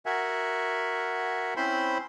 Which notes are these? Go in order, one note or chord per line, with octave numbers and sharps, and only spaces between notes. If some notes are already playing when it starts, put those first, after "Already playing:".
F#4 A#4 E5 F#5 G#5
C4 C#4 E4 C5 B5 C6